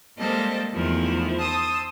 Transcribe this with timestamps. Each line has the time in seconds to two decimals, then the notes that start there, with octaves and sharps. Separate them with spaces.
0.18 G3 G#3 A#3 C4 A4 D#5
0.74 E2 D#3 F3 A3 E4
1.39 C5 A5 D#6 E6